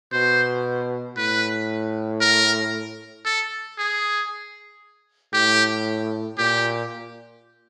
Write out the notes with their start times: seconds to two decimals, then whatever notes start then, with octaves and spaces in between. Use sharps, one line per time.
0.12 B2 C5
1.17 A2 B4
2.21 A#4
3.25 A4
3.78 G#4
5.33 A2 G4
6.38 A#2 G4